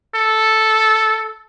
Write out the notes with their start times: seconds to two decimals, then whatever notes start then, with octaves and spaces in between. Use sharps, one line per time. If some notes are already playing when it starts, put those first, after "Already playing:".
0.15 A4